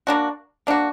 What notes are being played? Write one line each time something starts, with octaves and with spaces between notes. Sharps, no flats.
A#3 D4 F#4
A#3 D4 F#4